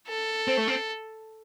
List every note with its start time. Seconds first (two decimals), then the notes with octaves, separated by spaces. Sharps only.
0.08 A4
0.48 C4
0.57 A3
0.68 C4